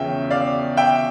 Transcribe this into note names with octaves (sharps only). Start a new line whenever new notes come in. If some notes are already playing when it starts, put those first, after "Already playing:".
Already playing: E2 C#3 F3 C#4 E5 G5
D5 F5
E5 G5